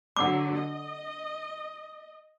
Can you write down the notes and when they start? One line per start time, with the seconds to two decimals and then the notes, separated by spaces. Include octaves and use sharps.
0.17 D3 F#3 F#5 D6
0.56 D#5